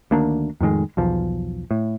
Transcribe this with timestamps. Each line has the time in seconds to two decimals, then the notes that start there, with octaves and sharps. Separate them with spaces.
0.11 D2 D#3 A#3 D4
0.60 F2 A2 D#3 G#3
0.97 B1 E2 F3
1.71 A2